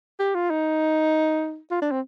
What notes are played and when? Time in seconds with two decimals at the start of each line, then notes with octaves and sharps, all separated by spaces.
0.20 G4
0.35 F4
0.50 D#4
1.71 F4
1.82 D4
1.91 C4